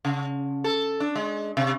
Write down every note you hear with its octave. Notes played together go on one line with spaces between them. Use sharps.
C#3
A4
D4
G#3
C3